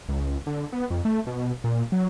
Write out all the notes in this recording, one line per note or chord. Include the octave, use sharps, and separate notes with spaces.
C#2
D3
B3
F2
A3
B2
A#2
F#3